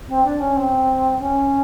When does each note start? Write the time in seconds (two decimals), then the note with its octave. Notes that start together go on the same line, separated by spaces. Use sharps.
0.08 C4
0.24 D4
0.40 C#4
0.56 C4
1.19 C#4